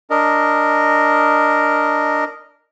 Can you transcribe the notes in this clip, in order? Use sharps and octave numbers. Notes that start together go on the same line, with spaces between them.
D4 A#4 D#5